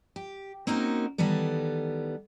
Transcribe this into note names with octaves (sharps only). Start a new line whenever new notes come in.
G4
A#3 C4 C#4 D#4 F#4 A#4
D#3 E3 G3 B3 A4